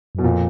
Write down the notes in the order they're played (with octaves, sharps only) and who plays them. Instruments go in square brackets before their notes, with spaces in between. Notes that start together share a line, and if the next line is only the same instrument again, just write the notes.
[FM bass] F#2 [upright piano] B2
[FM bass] F2 [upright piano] A#2